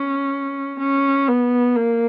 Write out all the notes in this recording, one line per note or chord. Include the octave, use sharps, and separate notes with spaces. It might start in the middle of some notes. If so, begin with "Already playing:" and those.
Already playing: C#4
C#4
B3
A#3